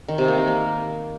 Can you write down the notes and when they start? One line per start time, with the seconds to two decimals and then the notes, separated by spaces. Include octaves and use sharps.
0.08 D#3
0.18 C3
0.28 A#3
0.38 D#4
0.47 A#3